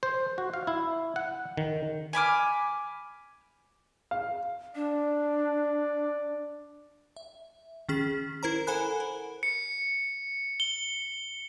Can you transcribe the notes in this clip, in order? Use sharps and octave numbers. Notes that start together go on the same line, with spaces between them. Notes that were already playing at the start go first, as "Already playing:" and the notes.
C5
F#4
F5
E4
F#5
D#3
G#5 B5 D6 F6
F5
D4 D5
E5
D#3 C#4 G#4 B6
E4 A#4 C5 A#5
A4 C5 F#5 G#5 B5 F#6
A#4
C#7
G7